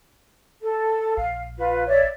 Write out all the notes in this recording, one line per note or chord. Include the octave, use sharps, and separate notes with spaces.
A4
A#1 F5
F4 B4
C#5 D5 E5